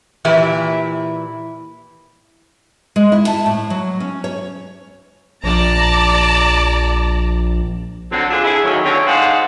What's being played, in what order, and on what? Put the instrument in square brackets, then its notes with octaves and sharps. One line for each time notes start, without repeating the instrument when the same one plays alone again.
[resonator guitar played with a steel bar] A#2 E3 E4 G4
[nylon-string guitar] G#3
E4
A5
A2
F#3
C#4
C#5
[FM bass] A#1 [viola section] D5 A5 A#5
[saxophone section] D3 F#3 C4
D3 D4 F4 G4 G#4
D3 E4 G#4
D#2 F#3
D#2 D3 C4 C#4 C#5
G#2 D3 G#4 C5 F5 F#5